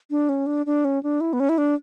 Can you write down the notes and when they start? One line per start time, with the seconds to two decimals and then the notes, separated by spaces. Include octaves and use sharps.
0.11 D4
0.29 C#4
0.46 D4
0.66 D4
0.85 C#4
1.03 D4
1.21 E4
1.33 B3
1.40 C#4
1.49 E4
1.58 D4